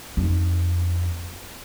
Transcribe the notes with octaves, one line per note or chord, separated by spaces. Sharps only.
F2 D#4